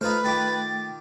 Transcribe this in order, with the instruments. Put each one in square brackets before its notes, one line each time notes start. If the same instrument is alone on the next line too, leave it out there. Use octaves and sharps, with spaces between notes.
[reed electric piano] A3 [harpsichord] D#4 F4 C5 [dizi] B4 [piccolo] F6
[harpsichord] D#3 F4 G4 [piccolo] A6